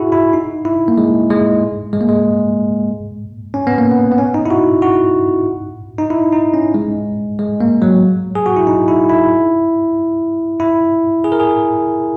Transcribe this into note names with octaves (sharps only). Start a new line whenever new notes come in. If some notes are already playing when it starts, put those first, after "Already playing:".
Already playing: E4 F#4 G#4
E4
D#4
E4
A#3
G#3
G#3
G#3
A#3
G#3
C#4
B3
A#3
B3
B3
C#4
D#4
E4
F#4
F#4
D#4
E4
D#4
C#4
G#3
G#3
A#3
F#3
G#4
F#4
E4
D#4
E4
E4
E4
G#4
A#4
G#4